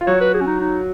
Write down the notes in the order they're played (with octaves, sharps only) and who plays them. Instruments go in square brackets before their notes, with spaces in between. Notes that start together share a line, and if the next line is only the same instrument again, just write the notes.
[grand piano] F4
[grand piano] F#3 F#4 [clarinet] C#5
[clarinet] B4
G#4
C#4
D#4
D#4